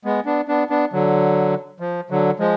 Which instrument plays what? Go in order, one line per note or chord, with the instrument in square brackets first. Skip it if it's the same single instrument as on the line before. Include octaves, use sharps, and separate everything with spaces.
[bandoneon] G#3 B3
B3 D4
B3 D4
B3 D4
D3 F#3
F3
D3 F#3
F3 G#3